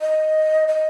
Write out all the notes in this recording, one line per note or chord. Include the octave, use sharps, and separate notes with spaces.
D#5
D#5